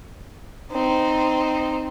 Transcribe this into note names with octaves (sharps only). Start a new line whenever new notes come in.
C4 D#4